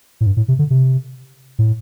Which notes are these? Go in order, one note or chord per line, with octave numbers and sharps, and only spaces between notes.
A2
G2
A2
C3
D3
C3
A2